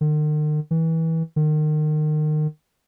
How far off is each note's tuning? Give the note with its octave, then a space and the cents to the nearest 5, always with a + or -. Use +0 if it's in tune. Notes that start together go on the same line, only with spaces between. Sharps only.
D#3 -45
E3 -25
D#3 -30